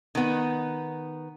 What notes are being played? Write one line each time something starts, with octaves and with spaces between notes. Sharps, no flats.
D#3 B3